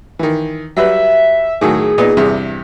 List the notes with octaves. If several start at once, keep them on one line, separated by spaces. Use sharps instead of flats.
D#3 E3
F#3 G3 B4 E5
A2 D#3 F#3 G#4
A#2 B3 D#4
E2 G2 C3